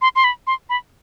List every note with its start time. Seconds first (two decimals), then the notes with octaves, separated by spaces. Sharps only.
0.02 C6
0.16 C6
0.24 B5
0.47 C6
0.70 B5